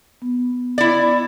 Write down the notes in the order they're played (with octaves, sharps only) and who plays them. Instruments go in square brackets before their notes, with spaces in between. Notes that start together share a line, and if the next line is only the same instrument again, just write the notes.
[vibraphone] B3
[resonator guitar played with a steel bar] E4 D5